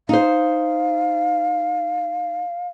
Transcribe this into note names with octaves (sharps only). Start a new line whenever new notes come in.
D#4 C5 F5